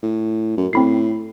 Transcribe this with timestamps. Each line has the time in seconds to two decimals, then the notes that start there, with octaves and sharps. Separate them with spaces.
0.03 A2
0.57 F#2
0.73 A2 C4 B5 C7